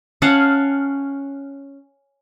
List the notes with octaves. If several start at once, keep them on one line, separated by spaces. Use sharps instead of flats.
C#4 F5 F#5 A5